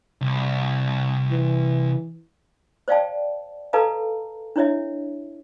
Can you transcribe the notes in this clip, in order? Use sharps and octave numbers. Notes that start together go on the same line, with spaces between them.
C2
E3
C5 D5 D#5 F5 G5 A5
A4 B4 D#5 F5 A5 A#5
D4 E4 C#5 D#5 E5